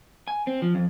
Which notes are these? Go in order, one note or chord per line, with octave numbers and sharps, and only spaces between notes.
G#5
C4
F3
F2